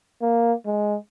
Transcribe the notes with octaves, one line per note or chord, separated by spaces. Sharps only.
A#3
G#3